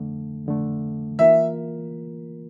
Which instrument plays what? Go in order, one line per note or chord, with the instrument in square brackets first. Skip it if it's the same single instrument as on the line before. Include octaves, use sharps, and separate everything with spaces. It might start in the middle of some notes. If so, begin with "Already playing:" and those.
Already playing: [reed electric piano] F2 D3 A3
F2 D3 A3
[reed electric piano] E3 A#3 F4 A#4 [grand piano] E5